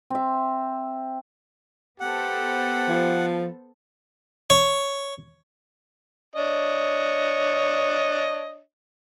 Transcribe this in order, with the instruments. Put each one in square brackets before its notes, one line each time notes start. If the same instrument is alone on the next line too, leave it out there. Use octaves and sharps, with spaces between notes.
[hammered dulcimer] C4 E5
[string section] B3 A4 C5 [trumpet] G4 [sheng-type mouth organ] F#5
[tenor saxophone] F3
[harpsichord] C#5
[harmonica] D4 C#5 D#5